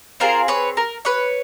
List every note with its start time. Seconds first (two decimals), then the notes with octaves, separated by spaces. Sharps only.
0.20 C4 F4 G#4 A#4 C5
0.48 B4 C#5
0.77 A#4
1.05 B4 C#5